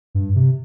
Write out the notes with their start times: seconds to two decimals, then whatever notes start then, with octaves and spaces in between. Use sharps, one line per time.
0.15 G2
0.35 C3